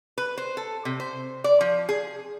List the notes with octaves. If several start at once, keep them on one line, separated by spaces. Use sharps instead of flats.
B4
C5
A4
C3
C5
D5
F3
G#4